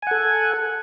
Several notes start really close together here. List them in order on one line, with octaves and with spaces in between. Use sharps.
G#5 F#5 A4